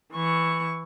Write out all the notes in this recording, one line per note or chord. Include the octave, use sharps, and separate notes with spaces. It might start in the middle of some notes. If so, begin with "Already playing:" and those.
E3 C#6